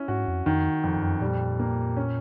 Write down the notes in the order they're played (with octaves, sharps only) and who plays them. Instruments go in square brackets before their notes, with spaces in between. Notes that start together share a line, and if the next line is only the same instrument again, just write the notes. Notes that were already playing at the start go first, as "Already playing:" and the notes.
Already playing: [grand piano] C#4 E4
[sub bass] G#2 [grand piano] F#4
[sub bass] F2
[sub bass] F2 [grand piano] D#3
[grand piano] F2
[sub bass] F#2
[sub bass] A#2 [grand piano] G3
[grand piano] A#3
C#4